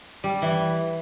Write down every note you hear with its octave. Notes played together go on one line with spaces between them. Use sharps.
G3
E3